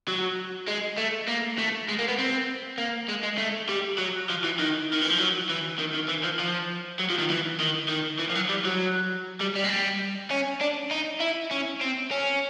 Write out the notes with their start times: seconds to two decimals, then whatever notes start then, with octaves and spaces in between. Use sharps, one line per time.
0.08 F#3
0.68 G#3
0.98 A3
1.28 A#3
1.58 A3
1.89 G#3
1.99 A#3
2.08 B3
2.19 C4
2.78 A#3
3.09 G#3
3.23 G#3
3.38 A3
3.69 G3
3.98 F#3
4.29 F3
4.44 E3
4.59 D#3
4.93 D#3
5.02 E3
5.10 F3
5.19 F#3
5.50 E3
5.80 D#3
5.94 D#3
6.09 E3
6.24 F3
6.39 F3
7.00 F#3
7.10 F3
7.19 D#3
7.30 E3
7.60 D#3
7.89 D#3
8.19 E3
8.30 F3
8.35 F#3
8.49 G3
8.65 F#3
9.41 G3
9.55 G3
9.64 G#3
9.70 G3
10.31 C#4
10.61 D4
10.91 D#4
11.20 E4
11.51 C#4
11.81 C4
12.11 C#4